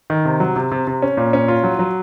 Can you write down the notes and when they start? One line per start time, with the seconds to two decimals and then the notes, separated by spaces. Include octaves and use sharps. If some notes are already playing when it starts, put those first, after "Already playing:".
0.10 D#3
0.25 C3
0.40 F#3
0.56 C3
0.72 C3
0.87 C3
1.02 C#4
1.17 A#2
1.33 C#4
1.48 F4
1.64 F#3
1.79 F#3